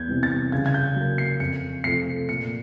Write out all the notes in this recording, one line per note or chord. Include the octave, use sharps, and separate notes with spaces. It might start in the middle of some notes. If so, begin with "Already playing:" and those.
Already playing: E2 G6 G#6
C3 E3 G3
A6
C#3 G#6
G#6
G6
F#3 A#3
C7
F2 C#7
C3 F3 A3 C7
A#2 C#7